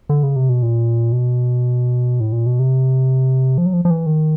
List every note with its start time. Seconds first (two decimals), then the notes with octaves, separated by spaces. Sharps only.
0.09 D3
0.23 C#3
0.36 C3
0.49 B2
0.62 A#2
1.12 B2
2.20 A2
2.32 A#2
2.46 B2
2.59 C3
3.58 F3
3.66 F#3
3.73 F3
3.85 F3
3.90 E3
4.06 D#3